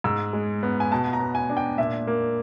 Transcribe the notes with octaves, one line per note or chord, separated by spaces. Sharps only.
G#2 E6
G#3
B3
G#5
B2 A5
A#5
B3
G#5
D4
G5
A#2 E5
A#3